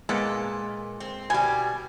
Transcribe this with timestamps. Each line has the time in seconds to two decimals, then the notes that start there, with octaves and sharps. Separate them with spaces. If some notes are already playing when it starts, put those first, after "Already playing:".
0.09 A#2 G#3 A#3 B3 A4
1.00 C4
1.30 B2 G3 G#5